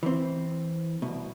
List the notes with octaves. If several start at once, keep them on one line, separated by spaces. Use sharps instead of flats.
E3 C4
C2 B2